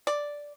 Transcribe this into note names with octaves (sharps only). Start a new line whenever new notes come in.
D5